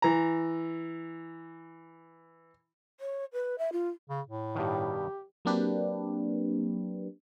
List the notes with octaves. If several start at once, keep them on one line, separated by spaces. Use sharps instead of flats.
E3 A#5
C#5
B4
E5
F4
C#3
A2
G2 B2 D#3 G4
F#3 A#3 C4 D4 G4 B4